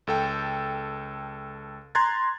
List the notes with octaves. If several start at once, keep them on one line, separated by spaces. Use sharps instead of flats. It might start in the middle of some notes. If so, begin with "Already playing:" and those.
C#2 A4 G5
A#5 C6 F#6 G#6 A6